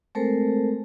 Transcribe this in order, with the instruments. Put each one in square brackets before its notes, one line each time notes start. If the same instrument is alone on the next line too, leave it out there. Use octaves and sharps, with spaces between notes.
[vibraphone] G#3 A3 C4 A4 A#4 C5